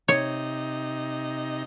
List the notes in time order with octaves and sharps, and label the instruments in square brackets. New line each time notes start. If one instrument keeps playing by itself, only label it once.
[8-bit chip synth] C3 D#4 D#5 [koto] C#5